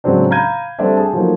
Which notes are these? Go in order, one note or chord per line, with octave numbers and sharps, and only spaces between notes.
A2 C#3 F#3 G#3 C4 D4
F5 A#5 B5 G6 G#6 D#7
G3 A3 C4 D4 D5 E5
G#4 A5
F3 F#3 A3 A#3 D#4